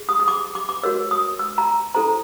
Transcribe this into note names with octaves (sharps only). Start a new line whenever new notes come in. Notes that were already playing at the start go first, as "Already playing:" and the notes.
Already playing: G#4
D#6
D#6
D6
D6
D6
F#4 A#4 C#5 E6
D#6
E6
A#5
E4 A4 C5 A#5